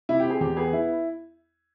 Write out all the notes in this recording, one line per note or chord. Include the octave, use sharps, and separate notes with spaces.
C3 E4
C4 G4
G#4
E2 G4
B3 G#4
E4